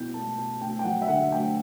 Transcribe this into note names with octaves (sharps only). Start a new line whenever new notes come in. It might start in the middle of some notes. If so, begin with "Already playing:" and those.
Already playing: B2 E4 G6
A3 A5
B2 A5
D2 G5
G5
F#3 F#5
E5
D3 F#5
D2 G5